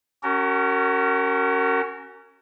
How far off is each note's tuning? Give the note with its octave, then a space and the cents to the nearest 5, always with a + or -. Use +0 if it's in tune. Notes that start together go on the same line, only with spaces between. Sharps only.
C#4 -5 F#4 +30 A#4 -25